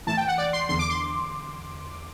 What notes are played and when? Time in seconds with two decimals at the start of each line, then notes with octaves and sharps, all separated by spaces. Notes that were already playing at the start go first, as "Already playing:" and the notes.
0.07 A2 E3 A5
0.17 G5
0.28 F#5
0.38 D5
0.53 C6
0.69 E2 D3 C6
0.79 D6
0.90 C6